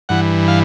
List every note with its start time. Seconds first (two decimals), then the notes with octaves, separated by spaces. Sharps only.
0.09 G2 E3 F#5
0.48 F5